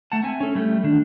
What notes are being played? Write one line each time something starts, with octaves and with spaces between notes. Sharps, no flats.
A3 F#5 A5
C4 E5 G#5
C#4 A4
G3 A3 G4
D#3 D4